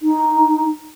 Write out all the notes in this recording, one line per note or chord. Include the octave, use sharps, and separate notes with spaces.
D#4